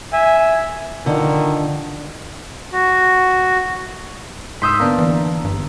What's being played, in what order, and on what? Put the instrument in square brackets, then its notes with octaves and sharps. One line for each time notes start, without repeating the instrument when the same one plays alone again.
[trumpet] E5 [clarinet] G#5
[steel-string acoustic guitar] D3 F3 [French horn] D#3
[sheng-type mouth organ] F#4
[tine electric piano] G#2 G6 [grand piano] C6 D#6 E6 [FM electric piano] B6
[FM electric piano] D3 B3 A#5 [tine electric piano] A#3 D4
[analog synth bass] E3
[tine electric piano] G1 [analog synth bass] G2